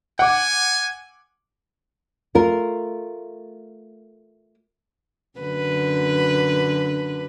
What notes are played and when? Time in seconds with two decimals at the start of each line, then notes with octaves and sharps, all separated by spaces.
0.19 F#5 G#5 D6
2.35 A3 F4 A#4
5.39 F#2 D3 B4